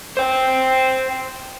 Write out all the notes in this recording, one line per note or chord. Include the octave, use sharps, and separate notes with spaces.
C5 G5